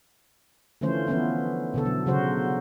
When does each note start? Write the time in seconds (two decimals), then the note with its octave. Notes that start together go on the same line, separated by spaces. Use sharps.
0.81 D3 E3 F3 A3 C#4 C5
1.07 E3 F3 B3 C#4 E4
1.74 B2 D3 A4
1.86 F#3
2.06 C#3 F#3 F#4 C5